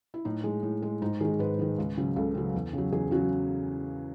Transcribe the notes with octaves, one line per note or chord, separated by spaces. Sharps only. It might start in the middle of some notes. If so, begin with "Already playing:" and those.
E4
A2 D#4
G#3
A2
G#3
G#2 D#4
D#3 G#3 G#4
G#2 B4
D#3 G#3
C#2
C#3 F#3
C#2 A4
C#3 F#3
E2
C#3 F#3
E2 G#4
C#3 F#3 F#4